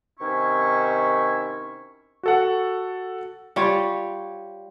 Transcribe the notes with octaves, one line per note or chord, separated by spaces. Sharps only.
C3 D#3 C#4 E4 C#6
F#4 A4 F#5
G3 F4 C#5